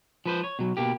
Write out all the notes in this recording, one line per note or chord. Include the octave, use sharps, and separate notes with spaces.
F3 B4 C5
C#5
B2 F#3
B2 A#3 G4